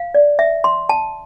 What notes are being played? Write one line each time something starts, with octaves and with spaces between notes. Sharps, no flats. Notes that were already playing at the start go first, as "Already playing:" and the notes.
Already playing: F5
D5
E5
C6
A5